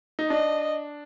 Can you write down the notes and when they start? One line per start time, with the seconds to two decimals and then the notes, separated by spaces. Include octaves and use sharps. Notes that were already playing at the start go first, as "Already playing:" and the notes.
0.19 D#4
0.30 D4 D#5